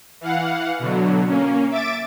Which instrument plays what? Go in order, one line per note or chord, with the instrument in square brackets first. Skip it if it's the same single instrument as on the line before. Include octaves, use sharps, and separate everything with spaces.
[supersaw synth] E3 F5 F#5
B2 D3 F#3
A#3 C#4
E5 D6 A6 D7